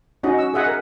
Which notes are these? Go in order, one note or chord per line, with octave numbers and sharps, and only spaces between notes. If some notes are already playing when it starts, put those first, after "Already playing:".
C#4 D#4 F#4 D#5
E6
G#4 D#5 E5 F#5 G#5 D#6
A#4